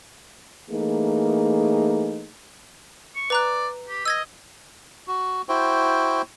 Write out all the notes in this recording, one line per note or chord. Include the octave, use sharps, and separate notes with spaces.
E3 A3 A#3 D#4 G#4
C#6
B4 D5 A#5 F#6
G4
D#5 E6 G#6 A#6
F#4
E4 F#4 C5 G5